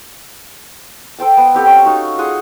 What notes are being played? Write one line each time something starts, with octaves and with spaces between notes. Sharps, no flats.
A4 C5 G5 A5
B3
C4 G4 A4
C#4
D#4 F#4 F5
F4 G#4 F#5 C6